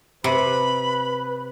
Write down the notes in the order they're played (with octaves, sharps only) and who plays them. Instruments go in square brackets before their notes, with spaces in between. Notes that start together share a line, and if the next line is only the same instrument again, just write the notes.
[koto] C3 [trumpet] B4 [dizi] B5